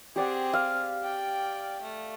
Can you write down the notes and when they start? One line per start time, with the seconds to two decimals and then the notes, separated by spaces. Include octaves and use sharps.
0.16 C4 G4 G#4 D5 F#5
0.53 F5
1.03 D5 G5
1.82 A3